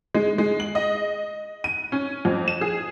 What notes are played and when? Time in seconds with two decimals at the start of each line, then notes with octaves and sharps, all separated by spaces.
0.14 G#3
0.38 G#3
0.60 F#7
0.75 D#5
1.64 D#7
1.92 C#4
2.25 F2
2.48 E7
2.61 G#4